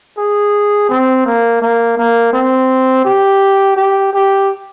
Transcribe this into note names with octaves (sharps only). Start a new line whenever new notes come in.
G#4
C4
A#3
A#3
A#3
C4
G4
G4
G4